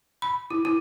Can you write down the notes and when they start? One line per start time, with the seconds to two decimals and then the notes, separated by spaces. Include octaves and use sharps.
0.22 B5
0.50 E4
0.65 E4